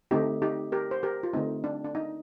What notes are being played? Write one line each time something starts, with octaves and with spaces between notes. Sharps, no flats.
D3 A3 C4 D#4 G4
D#4 G4
G4 A#4
C5
G4 A#4
F4
D3 A3 C4 D#4
D4
D4
D#4